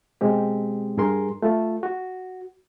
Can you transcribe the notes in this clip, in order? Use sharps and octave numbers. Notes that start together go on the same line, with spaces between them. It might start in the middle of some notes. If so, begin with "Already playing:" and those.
B2 G#3 C4 G4
G2 G#4 A#4 C6
A3 F4
F#4